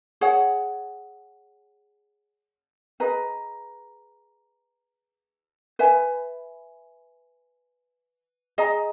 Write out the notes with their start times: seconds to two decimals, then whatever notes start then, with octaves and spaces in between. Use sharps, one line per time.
0.21 G#4 C#5 F#5
3.00 G#4 B4 D#5 A#5
5.79 B4 E5 G#5
8.58 G#4 D#5 A#5